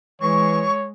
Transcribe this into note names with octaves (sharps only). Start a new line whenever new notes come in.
E3 G#3 C#5 C#6